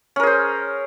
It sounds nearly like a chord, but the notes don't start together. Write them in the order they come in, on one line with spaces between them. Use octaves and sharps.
C#4 A#4 G#4 C5